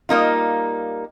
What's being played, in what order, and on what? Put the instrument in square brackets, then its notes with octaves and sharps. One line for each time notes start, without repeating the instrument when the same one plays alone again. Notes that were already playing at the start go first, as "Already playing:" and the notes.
[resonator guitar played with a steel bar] G3 A#3 D#4 F4